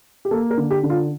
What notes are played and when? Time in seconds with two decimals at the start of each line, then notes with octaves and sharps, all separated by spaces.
0.25 G4
0.31 A#3 A4
0.51 A#4
0.57 D3
0.71 G4
0.83 D3
0.90 F4